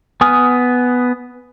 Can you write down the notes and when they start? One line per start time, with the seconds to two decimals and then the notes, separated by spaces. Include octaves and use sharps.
0.21 B3 G#5 D#6 F6